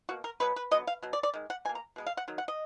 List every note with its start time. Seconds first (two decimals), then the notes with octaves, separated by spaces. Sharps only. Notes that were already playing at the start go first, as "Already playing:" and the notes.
0.09 B2 A#3 F#4
0.24 A#4
0.40 B2 F#3 B3 B4
0.56 B4
0.71 D3 F#3 B3 D#5
0.87 F5
1.03 B2 F#3
1.13 D5
1.23 D5
1.34 D#3 G#3
1.50 F#5
1.65 B2 G#5
1.69 A#3
1.75 A#5
1.96 B2 G#3 B3
2.07 F5
2.17 F#5
2.28 D#3 F#3
2.38 F#5
2.48 D#5